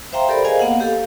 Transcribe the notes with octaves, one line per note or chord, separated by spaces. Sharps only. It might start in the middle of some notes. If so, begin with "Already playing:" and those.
C5 E5 F5 G5 A#5 C6
G4 A4 A#4 C5 D5 B5
G#4 A#4 C5 D#5 F5 G#5
A#3 B3 F5 F#5
G4 A4 F5